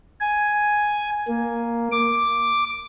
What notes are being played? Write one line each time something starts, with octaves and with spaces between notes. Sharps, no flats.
G#5
A#3
D6